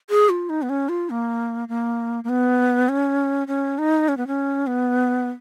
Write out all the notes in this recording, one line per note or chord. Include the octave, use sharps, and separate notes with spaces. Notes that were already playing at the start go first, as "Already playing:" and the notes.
G#4
F4
D#4
B3
C#4
F4
A#3
A#3
A#3
B3
C#4
C#4
D#4
C#4
B3
C#4
B3